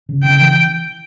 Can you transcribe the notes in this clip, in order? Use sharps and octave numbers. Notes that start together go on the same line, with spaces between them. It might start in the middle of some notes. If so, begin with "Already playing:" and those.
C#3
C#3 G5
E3